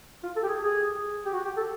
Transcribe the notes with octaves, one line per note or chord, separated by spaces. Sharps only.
F4
A4
G4
G#4
G#4
G4
F#4
G4
A4